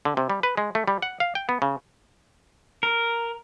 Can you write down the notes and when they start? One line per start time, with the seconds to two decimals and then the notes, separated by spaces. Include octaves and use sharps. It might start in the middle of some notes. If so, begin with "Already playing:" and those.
0.05 D3
0.17 C3
0.30 G3
0.43 B4
0.57 G#3
0.75 A3
0.88 G3
1.02 F#5
1.20 F5
1.35 G5
1.49 B3
1.62 C#3
2.83 A#4